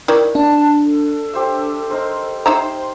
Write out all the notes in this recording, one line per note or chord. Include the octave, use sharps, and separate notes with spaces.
D#3 E4 D5
D4 A5
A4
G4 C5 E5
D#4 A#4 C5
D#4 C5 E5 G5 A#5 C6